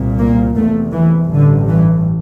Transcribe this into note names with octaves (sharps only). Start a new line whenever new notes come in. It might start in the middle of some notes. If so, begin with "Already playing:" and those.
Already playing: C2 A#2
A#3
F1 E2 C3 A3
E3
A1 G2 D3
E3